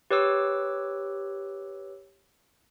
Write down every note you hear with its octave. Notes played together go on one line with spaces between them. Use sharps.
G4 B4 C#5 D6 E6